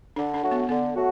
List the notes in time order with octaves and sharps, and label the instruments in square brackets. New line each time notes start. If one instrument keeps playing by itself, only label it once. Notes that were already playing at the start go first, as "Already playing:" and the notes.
[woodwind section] D3 [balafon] D4
[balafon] D4
[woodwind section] F#3 A3 F#4
[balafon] B3
[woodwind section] D3 [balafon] B3
[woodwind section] F#3 A3 F#4